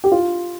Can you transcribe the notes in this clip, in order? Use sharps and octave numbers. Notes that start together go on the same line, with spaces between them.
G4
F4